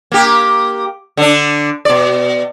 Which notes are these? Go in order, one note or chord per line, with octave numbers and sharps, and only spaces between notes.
A#3 G4
D3 D4
B2 D5